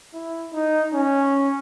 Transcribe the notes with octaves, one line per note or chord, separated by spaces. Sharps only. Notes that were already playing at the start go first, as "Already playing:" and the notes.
E4
D#4
C#4